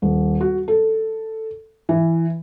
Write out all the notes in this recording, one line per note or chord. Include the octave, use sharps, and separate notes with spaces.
D#1
F#4
A4
E3